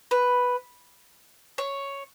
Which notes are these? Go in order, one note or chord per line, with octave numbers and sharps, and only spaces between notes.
B4
C#5